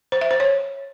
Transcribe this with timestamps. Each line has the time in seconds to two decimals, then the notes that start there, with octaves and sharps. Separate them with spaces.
0.12 C5
0.21 E5
0.31 C5
0.40 C#5